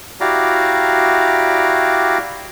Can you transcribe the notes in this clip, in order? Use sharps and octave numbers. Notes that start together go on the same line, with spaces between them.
E4 F#4 G4 D5 F5 A#5